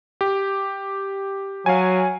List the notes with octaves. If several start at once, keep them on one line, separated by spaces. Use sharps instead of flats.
G4
F#3 F5 G#5